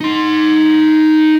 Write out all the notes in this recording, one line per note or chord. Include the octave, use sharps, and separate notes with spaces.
D#4 C6